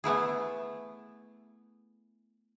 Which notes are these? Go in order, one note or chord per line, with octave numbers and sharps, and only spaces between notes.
A3 B3 E4 G#4